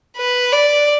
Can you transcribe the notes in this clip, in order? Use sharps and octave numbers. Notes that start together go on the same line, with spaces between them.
B4
D5